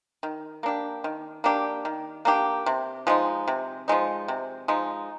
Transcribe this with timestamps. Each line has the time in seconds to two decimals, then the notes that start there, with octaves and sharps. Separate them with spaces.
0.23 D#3
0.63 A#3 D4 G4
1.04 D#3
1.44 A#3 D4 G4
1.85 D#3
2.25 A#3 D4 G4
2.66 C3
3.07 F3 G#3 D#4
3.48 C3
3.88 F3 G#3 D#4
4.28 C3
4.68 F3 G#3 D#4